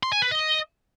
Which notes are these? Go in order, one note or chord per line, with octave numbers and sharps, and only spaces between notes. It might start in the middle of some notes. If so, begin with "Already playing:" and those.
C6
G#5
B4
D#5